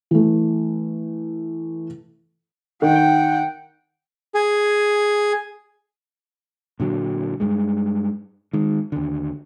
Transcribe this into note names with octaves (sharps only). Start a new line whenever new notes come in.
E3 A3
D#3 F#5 G5
G#4
A#2 D3 F#3
G2 G#3
D#3 G#3
D#2 D3